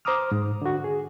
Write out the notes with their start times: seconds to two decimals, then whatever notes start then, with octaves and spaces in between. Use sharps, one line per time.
0.05 C5 A#5 D6 D#6 F6
0.32 G#2
0.62 D3 F#4
0.84 G#4